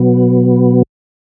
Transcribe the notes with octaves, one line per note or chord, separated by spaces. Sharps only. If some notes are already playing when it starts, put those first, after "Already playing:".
Already playing: B2 F#3 B3